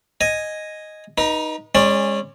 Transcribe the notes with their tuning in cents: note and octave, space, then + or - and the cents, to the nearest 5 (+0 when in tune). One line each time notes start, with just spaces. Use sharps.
D#5 +0 G#5 +0
D#4 +0 B4 -40
G#3 -25 C#4 -20 D5 +10